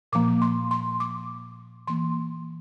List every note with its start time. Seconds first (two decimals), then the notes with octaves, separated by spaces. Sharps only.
0.13 A#2 F3 A#3 D6
0.42 C6
0.71 C6
1.00 D6
1.87 E3 A#3 C6